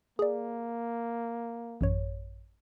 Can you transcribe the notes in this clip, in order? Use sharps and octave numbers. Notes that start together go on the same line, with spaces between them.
A#3 G#4 D5
A1 F#2 C#5